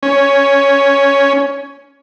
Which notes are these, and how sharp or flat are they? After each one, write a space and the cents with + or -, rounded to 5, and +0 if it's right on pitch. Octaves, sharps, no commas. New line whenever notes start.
C#4 +5